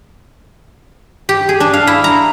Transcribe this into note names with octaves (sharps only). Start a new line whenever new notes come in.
G4
G#4
D4
F5
E4
A#5